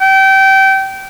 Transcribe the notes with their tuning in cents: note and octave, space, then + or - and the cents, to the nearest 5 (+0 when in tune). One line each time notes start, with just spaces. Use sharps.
G5 -25